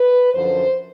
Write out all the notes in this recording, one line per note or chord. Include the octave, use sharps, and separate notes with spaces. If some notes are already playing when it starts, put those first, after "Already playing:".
Already playing: B4
F#2 D3 F3 C5